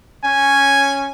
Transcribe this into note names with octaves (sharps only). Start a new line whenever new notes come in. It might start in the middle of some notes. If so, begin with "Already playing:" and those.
C#4 G#5